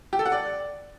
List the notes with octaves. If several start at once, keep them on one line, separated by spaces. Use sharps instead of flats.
G4
A4
F#5
D5